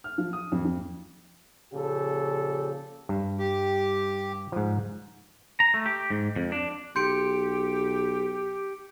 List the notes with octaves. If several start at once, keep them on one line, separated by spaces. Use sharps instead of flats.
F6
F3
D#6
F2
F2
A#2 C#3 F3 G4 A4
G2
G4
G#2 F3
A#5
A3
G4
G#2
F2
D4
B1 G4 C6 G6 C#7 D7